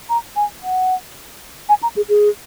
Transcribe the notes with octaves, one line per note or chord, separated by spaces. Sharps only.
A#5
G#5
F#5
G#5
A#5
G#4
G#4